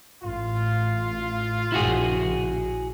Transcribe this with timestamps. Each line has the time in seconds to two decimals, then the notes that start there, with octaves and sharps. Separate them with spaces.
0.24 A1 F4
1.72 A#1 C#3 E4 F#4 G#4